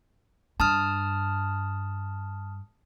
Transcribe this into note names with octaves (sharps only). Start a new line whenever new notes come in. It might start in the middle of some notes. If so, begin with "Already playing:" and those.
G2 A5 D#6 F6